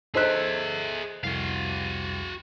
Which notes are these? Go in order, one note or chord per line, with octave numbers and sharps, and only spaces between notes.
D#4 G#4 A4 C5 E5 F#6
C2 F2 F#4 F5